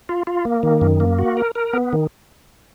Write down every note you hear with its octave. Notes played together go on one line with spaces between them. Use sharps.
F4
F4
A#3
D#3
F#2
A#3
F#4
A#4
A#4
B3
D#3